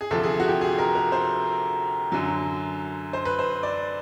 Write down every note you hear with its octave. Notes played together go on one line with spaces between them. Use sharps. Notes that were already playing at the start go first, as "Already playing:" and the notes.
G#4
D2 C3 F3 A4
G#4
F#4
G4
G#4
A#4
A#4
C5
F#2 D3 F#3
C5
B4
C5
D5